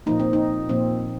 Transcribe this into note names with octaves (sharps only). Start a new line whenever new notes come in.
A#2 F3 A#3 D#4
C4
D#4
A#2 F3 A#3 C4